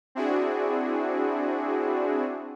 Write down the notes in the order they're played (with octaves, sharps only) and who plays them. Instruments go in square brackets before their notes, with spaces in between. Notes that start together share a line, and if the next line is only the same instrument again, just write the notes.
[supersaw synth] C4 D4 E4 F#4 G#4